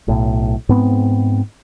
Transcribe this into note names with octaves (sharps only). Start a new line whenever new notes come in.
B1 A2
G#2 B3 C4